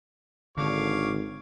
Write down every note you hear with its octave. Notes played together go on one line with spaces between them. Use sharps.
G#1 D3 C#5 F5 D6